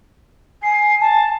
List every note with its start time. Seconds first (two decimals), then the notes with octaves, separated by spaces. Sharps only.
0.63 G#5 C7
1.01 A5